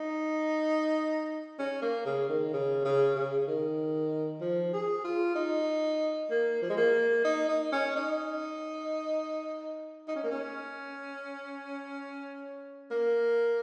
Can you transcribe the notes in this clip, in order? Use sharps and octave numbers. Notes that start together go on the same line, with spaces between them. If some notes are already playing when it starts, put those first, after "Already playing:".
Already playing: D#4
C#4
A#3
C#3
D#3
C#3
C#3
C#3
D#3
F3
G#4
F4
D#4
A#3
F3
G#3
A#3
D#4
D#4
C#4
D#4
D#4
C#4
A#3
C#4
A#3